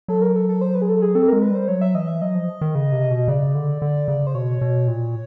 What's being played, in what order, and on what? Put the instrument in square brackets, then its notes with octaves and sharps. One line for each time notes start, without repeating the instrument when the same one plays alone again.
[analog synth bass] F#3 [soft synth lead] A4
[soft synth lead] A#4
A4
A4
C5
B4
G#4
A4
G#4
[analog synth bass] C4 [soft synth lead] A4
[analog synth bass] G#3 [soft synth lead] A#4
[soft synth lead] B4
[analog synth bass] G3 [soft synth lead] C5
[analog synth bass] F#3 [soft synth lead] C#5
[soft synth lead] E5
[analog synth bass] E3 [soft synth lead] D#5
[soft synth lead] E5
[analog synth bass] F#3 [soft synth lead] D#5
[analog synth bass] F3
D#3
C#3
C3
B2
[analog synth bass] C#3 [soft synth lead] D5
[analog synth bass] D3
D3
C#3
[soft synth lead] C5
[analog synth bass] B2 [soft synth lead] C#5
[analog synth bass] B2
A#2